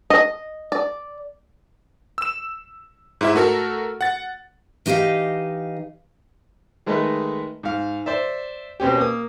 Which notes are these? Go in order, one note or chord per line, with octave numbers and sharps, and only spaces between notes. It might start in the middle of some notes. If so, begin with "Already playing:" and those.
D#5
D5
E6 E7
G#2 E4 E5
A3 F#4 A4 A#4
F#5 A6
E3 D#4 G4 D#5 F5
D#3 G#3 A3 B4 D#5
G#2 F5
C5 D5 E5
B2 C4 C#4 G4
A#3 D#6